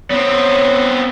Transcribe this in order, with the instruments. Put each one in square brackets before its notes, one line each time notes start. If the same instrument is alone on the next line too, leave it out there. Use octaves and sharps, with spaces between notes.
[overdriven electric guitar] B3 C4 [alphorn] C#5